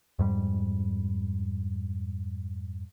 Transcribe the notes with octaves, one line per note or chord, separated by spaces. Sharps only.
F2 G#2 G3